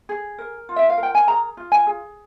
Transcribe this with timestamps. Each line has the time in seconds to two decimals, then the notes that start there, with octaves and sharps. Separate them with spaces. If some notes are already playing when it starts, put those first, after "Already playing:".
0.09 G#4
0.38 A#4
0.69 F4
0.76 E5
0.89 F5
0.97 A#4
1.03 G5
1.15 G#5
1.27 G#4 A#5
1.57 F4
1.72 G#5
1.87 G#4